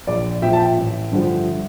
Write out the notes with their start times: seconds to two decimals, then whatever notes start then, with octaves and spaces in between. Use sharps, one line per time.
0.07 A#1 D5
0.42 A#2 F3 E5 G5
0.53 A5
0.59 E5 G5
0.77 A1
1.12 G2 D3 F3